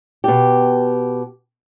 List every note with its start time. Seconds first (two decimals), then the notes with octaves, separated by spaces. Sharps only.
0.24 B2 G4